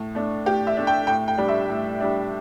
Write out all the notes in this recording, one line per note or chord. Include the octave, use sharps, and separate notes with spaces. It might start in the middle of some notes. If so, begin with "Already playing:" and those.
Already playing: A2
A3 D4
A2 G4
E5
A3 D4
G5
A2 G5
G5
G3 D4
E5
A2
G3 D4